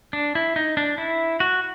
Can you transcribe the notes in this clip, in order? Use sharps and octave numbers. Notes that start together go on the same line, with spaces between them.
D4
E4
D#4
D4
E4
F#4